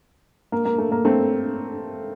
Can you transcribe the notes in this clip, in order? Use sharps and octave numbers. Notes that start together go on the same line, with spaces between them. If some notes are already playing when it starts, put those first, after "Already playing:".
A#3
A#3
A3
A#3
A3 C4